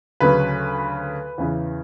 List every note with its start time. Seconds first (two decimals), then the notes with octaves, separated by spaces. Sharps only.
0.20 D2 C#3 F#3 B4
1.38 E2 C#3 E3